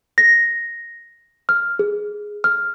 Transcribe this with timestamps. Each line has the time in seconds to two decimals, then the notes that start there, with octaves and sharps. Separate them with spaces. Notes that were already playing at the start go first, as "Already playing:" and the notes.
0.18 A#6
1.49 F6
1.79 G#4
2.44 F6